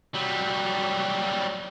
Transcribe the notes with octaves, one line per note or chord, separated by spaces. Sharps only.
F#3 G3